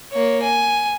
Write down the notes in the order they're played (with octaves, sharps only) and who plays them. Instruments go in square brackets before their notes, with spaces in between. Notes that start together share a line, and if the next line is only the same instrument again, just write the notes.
[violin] A#3 C#5
G#5